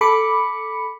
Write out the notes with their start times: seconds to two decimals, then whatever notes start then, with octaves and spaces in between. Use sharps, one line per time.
0.01 A4 B5 D6 C#7